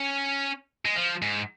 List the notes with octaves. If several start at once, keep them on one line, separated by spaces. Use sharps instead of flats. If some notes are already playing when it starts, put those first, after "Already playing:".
Already playing: C#4
G#3
F3
G#2